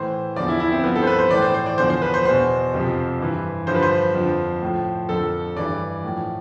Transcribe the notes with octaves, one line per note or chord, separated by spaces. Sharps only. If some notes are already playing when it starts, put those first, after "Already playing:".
Already playing: A2 E3 C5
E2 D3 F3 D5
E4
E4
C4
G2 F3 B3
A4
C5
B4
C5
A2 E3 D5
C5
C5
D5
E2 D3 F3 C5
C5
B4
C5
E2 B2 C5
F2 C3 F3
G2 E3
G2 D3 F3 C5
B4
C5
F2 D3 F3
A2 F3
F2 D3 F3 A4
G2 E3 D5
A2 F3